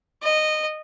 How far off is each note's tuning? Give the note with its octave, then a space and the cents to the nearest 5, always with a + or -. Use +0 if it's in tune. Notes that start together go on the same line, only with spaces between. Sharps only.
D#5 -15